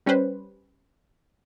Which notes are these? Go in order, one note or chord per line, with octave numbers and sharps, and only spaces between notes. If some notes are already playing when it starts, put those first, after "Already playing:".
G3 C#4 G4 B4 C5